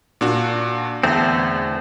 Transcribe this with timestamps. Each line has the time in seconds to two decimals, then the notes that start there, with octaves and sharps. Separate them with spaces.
0.21 A#2 D4 F#4
1.03 E2 D3 A3 C4